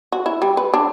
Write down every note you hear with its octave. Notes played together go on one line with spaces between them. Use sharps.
F#4
E4
G3
B4
D4